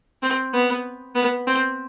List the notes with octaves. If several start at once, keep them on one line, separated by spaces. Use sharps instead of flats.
C4
B3
B3
C4